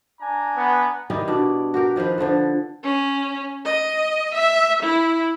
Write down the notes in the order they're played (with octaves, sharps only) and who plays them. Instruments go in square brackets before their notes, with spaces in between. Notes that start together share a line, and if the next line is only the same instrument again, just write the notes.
[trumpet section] D4 G#5 A#5
[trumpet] B3
[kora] D#3 G3 D#4 E4
B2 D4
F#4 G4 A#4
D#3 F3 F4 B4
D3 F3 F4 A4
[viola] C#4
D#5
E5
E4